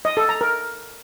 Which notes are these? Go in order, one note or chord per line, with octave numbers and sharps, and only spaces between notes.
D#5
A4
A#5
A#4